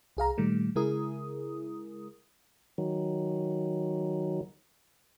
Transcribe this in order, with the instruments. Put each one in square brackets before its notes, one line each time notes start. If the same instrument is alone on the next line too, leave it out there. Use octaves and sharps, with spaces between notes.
[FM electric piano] C2 G#4 F5 A#5
A#2 D#3 G3 A3
C#3 G#3 E4 G#4 A#4 D#6
[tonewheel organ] D#3 F#3